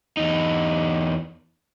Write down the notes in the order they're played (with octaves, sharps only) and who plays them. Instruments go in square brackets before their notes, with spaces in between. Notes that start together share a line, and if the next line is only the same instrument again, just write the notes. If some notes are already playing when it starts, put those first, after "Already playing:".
[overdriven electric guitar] E2 D#4